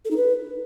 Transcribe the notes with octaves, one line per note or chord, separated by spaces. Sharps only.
A4
D#4
B4